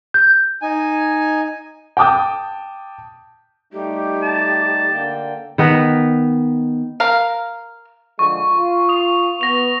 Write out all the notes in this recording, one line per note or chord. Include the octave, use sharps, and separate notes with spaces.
G6
D#4 G#5
G5 A5 D6 D#6 G6
G3 A3 D#4 G4
A5
D3 A#3 G5
D#3 B3 A#4 B4
A#4 F5
D3 F3 G#3 C#6
F4
D#6 F7
B3 A#6 F7